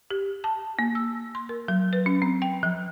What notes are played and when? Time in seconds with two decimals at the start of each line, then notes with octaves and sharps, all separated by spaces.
0.11 G4
0.44 A5
0.79 A#3
0.95 E6
1.35 C6
1.49 A#4
1.68 F#3
1.93 B4
2.06 C#4
2.22 C4
2.42 G5
2.63 F3